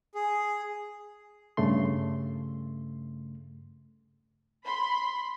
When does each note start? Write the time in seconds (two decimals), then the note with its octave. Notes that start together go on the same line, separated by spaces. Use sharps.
0.15 G#4
1.57 G2 C#3 A3 C6
4.65 B5 C6